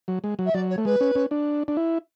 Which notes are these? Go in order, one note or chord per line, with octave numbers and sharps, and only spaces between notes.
F#3
G#3
F#3
E5
F#3 D5
C#5
A3
G#3 B4
C#4
C#4
D4
D4
E4